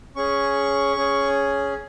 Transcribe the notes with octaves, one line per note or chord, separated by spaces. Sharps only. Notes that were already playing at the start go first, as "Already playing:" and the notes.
C#4 G#4 C#6
C#4 G#4